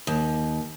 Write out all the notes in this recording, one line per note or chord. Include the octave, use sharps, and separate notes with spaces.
D#2